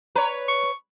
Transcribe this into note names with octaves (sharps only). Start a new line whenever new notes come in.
B4 C#5 A#5
C#6